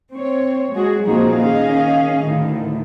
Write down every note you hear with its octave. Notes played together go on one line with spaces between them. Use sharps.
C4 C#5
G#3 F#4 G#4
A#2 F3 C4 D#4 F#4 G#4
D#3 C#4 G#4 D#5 F5
D2 A2 D#3